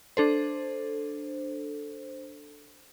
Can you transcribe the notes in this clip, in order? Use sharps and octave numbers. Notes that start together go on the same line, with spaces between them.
D4 A4 C5